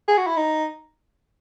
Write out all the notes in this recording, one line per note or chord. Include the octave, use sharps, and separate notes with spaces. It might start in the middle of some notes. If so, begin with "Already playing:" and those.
G#4
F#4
E4
D#4